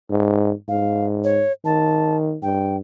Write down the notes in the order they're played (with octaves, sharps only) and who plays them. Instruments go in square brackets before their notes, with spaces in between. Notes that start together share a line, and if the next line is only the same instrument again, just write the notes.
[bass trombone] G#2
[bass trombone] G#2 [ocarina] F5
[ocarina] C#5
[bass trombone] D#3 [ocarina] A5
[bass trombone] G2 [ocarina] G5